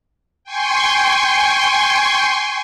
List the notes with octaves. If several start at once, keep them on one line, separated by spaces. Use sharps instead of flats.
G5 G#5 C6 C#6